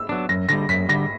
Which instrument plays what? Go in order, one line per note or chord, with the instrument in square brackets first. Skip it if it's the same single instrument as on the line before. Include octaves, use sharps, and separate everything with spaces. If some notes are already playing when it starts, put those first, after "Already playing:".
Already playing: [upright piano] E6
[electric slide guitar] F#3 B3 D4
[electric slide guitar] F#2 [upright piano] A#6
[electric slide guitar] D3 G3 [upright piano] A#6
[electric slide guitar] F#2 [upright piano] B6
[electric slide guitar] D3 G3 [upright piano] A#6